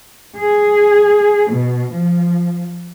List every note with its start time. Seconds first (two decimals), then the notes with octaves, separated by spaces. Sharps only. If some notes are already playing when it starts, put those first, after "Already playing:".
0.37 G#4
1.50 B2
1.92 F3